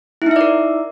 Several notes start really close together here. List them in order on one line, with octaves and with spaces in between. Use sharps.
E4 D#4 E5 D5 A#4